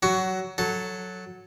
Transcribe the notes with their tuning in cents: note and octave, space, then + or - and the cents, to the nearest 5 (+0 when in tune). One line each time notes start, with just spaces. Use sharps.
F#3 +20 F#4 +10 C#6 +15
F#3 -5 A4 +0